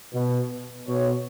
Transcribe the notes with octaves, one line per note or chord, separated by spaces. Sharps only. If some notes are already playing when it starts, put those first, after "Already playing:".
B2
B2 C#5